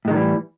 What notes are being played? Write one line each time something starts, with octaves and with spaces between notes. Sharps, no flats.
A2 D#3 E3 G3 G#3